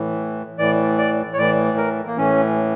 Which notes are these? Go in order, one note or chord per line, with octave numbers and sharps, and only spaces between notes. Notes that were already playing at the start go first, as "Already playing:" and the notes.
Already playing: A2 E3
A2 E3 D5
D5
C#5
A2 E3 D5
A#4
A#3
A2 E3 C#4